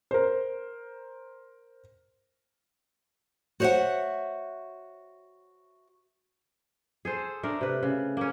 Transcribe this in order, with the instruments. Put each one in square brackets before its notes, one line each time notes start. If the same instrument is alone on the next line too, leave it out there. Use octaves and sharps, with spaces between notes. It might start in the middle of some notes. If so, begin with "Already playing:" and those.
[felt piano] A#4 C5
[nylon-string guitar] F#4 C5 C#5 D#5 E5 F#5
[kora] G#4 A4 C5
A3 D4 A#4
C3 B4
C#3
A#3 C#4